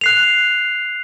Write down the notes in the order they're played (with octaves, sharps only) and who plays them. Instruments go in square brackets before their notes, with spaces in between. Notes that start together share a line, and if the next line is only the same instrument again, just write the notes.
[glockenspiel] F#6 C7 F7